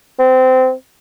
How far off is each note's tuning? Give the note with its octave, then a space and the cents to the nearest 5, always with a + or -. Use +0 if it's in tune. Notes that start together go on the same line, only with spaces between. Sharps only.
C4 -20